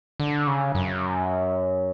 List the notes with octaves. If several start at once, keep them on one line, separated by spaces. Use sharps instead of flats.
D3
C#3
F#2